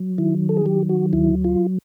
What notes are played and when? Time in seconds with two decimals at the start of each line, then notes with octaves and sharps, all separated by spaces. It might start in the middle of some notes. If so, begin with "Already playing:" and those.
Already playing: F#3
0.18 D#3 E4
0.49 A4
0.57 G#4
0.66 F#3 G4
0.89 F#4
1.13 D2 E4
1.44 F4